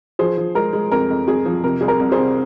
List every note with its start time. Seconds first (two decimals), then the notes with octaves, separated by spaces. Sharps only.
0.19 F3 G#4 C5
0.37 F3
0.55 G#3 A#4
0.73 G#3
0.91 F2 A#4
1.10 F2
1.27 F2 G#4
1.46 F3
1.64 C3 A#4
1.81 C2 G#4
1.88 A#4
2.00 C2
2.12 G#4 C5
2.18 C3